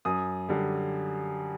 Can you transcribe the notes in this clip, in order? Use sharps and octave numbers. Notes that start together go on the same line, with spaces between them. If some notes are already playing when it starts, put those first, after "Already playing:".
F#2 D#6
D3 G3